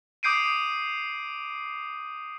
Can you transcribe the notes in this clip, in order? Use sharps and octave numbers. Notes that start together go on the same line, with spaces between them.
D6 D#6 G6 C7 D7 D#7